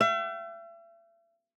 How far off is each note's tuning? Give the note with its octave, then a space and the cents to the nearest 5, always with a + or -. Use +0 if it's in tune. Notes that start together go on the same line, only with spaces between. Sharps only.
E5 +40 G5 -45